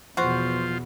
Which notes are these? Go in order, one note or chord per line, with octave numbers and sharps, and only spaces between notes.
E2 B2 F3 F4 F#4 C5